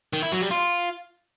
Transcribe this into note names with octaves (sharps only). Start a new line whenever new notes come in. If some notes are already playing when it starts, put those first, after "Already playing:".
D#3
E4
F#3
G3
F4